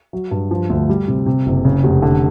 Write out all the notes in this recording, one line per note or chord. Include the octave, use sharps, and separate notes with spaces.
F#3
G2
F3
D2
G3
C3
C3
F#1
C#3
F1
D3